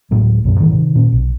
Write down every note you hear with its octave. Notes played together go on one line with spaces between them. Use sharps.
D2 A2 F#3 G#3
C2 F#2 B2
G#2 D#3 E3 G3
C3 D#3
A#2 C#4
B1